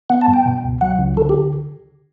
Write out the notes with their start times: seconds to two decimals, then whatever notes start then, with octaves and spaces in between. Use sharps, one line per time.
0.10 B3 F#5
0.21 A5
0.28 G2
0.34 G5
0.46 B2
0.64 C#2
0.81 F#3 F#5
0.99 C#2
1.17 D3 A4
1.29 G4